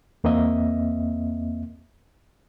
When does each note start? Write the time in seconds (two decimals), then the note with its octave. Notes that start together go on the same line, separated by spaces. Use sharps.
0.24 E2 A#3 C4 D#5 E5